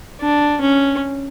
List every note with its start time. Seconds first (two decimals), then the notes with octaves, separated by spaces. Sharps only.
0.21 D4
0.61 C#4